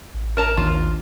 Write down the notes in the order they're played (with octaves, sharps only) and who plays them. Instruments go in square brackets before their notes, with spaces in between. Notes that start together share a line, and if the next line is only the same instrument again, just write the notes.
[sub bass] A1
[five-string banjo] A#4 A5 A#5
[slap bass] D#2 D4 [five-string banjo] F4